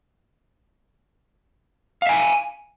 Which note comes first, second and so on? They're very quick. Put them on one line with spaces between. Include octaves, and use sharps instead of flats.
F5 E5 G#5